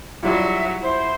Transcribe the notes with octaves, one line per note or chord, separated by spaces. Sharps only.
F#3 G3 E4 F4 E5
E4 C5